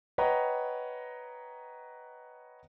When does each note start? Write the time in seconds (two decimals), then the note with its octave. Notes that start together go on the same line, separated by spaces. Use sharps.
0.18 B4 C#5 D#5 F#5 G5 A#5